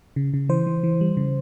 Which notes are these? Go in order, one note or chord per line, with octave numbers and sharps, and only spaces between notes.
C#3
C#3
E3 C5
E3
E3
G3
C#3